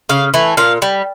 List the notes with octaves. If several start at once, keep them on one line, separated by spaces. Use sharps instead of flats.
C#3 F5
E3 A3
A#2 F5
G3